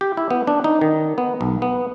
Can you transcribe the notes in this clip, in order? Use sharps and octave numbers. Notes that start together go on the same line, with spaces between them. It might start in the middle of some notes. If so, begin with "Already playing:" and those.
G4
E4
B3
D4
D#4
D#3
B3
B1
B3